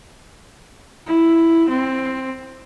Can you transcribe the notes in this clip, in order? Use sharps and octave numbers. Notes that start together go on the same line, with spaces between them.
E4
C4